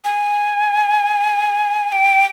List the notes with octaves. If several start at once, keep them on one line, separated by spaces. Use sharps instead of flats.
G#5
G5